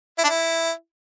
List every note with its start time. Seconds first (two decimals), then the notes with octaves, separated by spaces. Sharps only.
0.18 E4
0.24 D4
0.29 E4